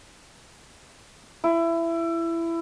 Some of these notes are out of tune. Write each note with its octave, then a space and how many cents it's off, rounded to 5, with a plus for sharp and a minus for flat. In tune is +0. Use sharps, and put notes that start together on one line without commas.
E4 +20